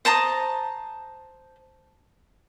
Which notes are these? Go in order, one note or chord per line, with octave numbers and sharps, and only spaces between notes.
C5 A5 A#5 D#6